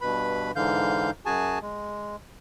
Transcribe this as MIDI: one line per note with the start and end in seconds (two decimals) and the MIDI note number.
0.01 0.51 43
0.01 0.51 47
0.01 0.51 71
0.01 0.51 83
0.56 1.11 44
0.56 1.11 50
0.56 1.11 52
0.56 1.11 77
0.56 1.11 91
1.26 1.59 42
1.26 1.59 66
1.26 1.59 68
1.26 1.59 80
1.26 1.59 81
1.62 2.16 56